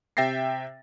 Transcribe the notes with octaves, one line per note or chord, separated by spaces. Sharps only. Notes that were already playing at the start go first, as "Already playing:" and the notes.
C3 E5 G5 A6 A#6 C7